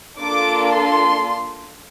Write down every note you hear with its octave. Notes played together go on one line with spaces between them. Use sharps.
A#3 D4 F4 A4 D6
C6